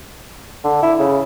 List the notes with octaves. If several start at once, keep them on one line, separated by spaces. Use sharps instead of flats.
D3
E4
C#3